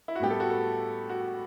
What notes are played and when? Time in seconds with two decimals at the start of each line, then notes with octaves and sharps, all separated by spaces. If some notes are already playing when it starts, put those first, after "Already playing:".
0.08 E4
0.15 F#4
0.20 A2 G3 B3 G4
0.30 A4
0.40 F#4
0.50 A4
1.09 F#4